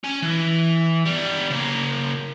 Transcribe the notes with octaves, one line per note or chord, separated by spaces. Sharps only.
C#4 G#5
E3
G3 B3
C#3 A#3